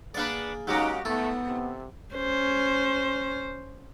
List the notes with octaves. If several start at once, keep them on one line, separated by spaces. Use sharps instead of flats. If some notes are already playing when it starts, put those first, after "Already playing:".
A#3 B3 D4 G#4 B4 D5
F#3 G#3 A#3 C#4 D#4 F#4 G4
G#2 A3 B3 A4
C3
C#4 C5